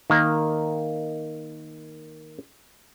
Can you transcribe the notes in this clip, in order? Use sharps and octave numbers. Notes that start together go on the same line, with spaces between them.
D#3 A#3 A#4